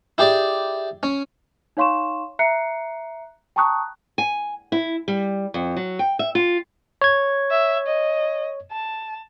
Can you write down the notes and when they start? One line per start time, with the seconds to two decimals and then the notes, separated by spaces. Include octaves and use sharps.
0.18 E4 G4 G#4 D5 D6
1.03 C#4
1.77 D#4 C#5 F5 C6 C#6 E7
2.39 E5 A#5 F#6 C7 C#7
3.56 G5 A5 A#5 C#6 D#6 F#6
4.18 G#5
4.72 E4
5.08 G3
5.54 F2
5.77 F#3
5.99 G5
6.19 E5
6.35 F4
7.02 C#5 G#6
7.51 E5
7.87 D#5
8.72 A5